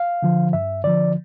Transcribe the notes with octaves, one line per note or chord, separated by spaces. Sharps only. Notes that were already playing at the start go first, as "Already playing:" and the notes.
Already playing: F5
D3 F3
G2 E5
D3 F3 D5